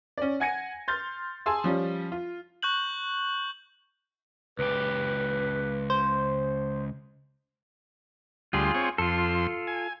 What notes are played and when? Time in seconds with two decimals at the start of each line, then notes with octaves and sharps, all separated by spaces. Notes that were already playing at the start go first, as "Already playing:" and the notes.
0.18 C#4 D5
0.40 F#5 G#5 G#6 A#6 C#7 D#7
0.88 C6 F6 G6 A6
1.46 G#4 G#5 A5 C6 E6
1.64 F3 G3 C#4
2.12 F4
2.62 C#6 F#6 G6 F#7
4.59 C#2 G4 B4
5.90 C5
8.53 D2 G3 F4 G#4 C6
8.74 C4 C#5
8.98 F2 F4 A4 C6
9.67 G#5